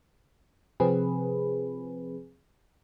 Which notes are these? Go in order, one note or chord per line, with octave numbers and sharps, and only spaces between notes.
C3 F3 C4 G#4 B4